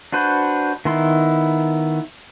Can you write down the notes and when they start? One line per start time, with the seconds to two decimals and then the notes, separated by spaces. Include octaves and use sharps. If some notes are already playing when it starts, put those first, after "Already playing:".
0.12 D4 F#4 B4 C5
0.85 D#3 B3 E4 C6